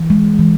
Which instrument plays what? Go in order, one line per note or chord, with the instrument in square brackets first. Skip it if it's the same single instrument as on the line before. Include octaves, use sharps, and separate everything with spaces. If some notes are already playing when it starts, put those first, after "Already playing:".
Already playing: [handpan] E3
G#3
E3